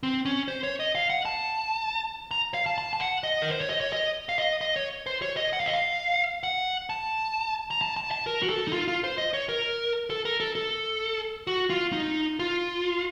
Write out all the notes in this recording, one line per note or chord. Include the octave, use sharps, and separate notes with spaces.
C4
C#4
C5
C#5
D#5
F5
F#5
A5
A#5
F5
A5
A5
A5
F#5
D#5
A#4
C5
C#5
D#5
C#5
D#5
F5
D#5
D#5
C#5
C5
C#5
D#5
F#5
F5
D#5
F5
F#5
A5
A#5
A5
A5
A5
A#4
F#4
A4
D#4
F4
F4
C5
D#5
C#5
A#4
A4
A#4
A4
A4
F#4
F4
D#4
F4